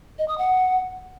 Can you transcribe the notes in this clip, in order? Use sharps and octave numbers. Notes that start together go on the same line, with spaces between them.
D#5
D#6
F#5